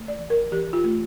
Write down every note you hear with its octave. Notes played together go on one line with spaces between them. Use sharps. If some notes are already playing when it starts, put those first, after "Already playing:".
Already playing: A3
D5
E3
A#4
E3 G4
F4
A3